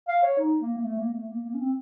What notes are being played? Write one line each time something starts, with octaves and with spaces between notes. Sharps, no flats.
F5
C#5
D#4
A#3
A#3
A3
A#3
A3
A#3
A#3
C#4
C4